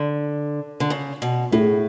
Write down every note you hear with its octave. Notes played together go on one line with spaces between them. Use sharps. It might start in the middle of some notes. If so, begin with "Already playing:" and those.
Already playing: D3
D3
C#3
B2
A2 A3 E4 G#4